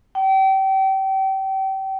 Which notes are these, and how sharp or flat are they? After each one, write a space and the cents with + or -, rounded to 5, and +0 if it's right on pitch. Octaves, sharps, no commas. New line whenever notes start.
G5 -30